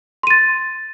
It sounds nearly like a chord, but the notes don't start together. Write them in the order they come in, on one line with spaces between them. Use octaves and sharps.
C6 D#7 A6